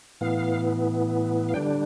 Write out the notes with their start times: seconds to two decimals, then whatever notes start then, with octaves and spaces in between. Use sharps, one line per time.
0.21 A2 E3 B3 F5
1.49 F5
1.54 D3 G3 D4 G5